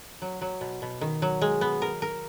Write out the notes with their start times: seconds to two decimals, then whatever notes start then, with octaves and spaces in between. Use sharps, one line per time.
0.22 F#3
0.41 F#3
0.61 B2
0.82 B2
1.01 D#3
1.22 F#3
1.41 G#3
1.61 B3
1.82 A#4
2.02 A#4